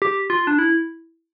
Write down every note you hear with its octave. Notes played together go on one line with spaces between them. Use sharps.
G4
F4
D4
E4